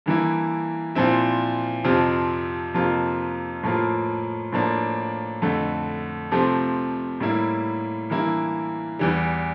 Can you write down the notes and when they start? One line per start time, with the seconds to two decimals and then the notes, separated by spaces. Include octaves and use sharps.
0.06 G2 E3 A#3 E4
0.95 A#2 F3 C4 E4
1.84 F2 C3 F3 C4 F4
2.74 F2 C3 F3 A#3 F4
3.63 A2 F3 A#3 F4
4.53 A2 F3 A#3 D4
5.42 F2 D3 A3
6.31 C3 F3 A3 C4
7.20 A2 G3 A#3 E4
8.10 G2 E3 A#3 E4
8.99 E2 E3 G3